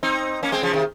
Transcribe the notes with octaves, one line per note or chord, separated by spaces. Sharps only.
C4 D#4
A#3 C#4
G#3 C4
C#3 F3
C3 D#3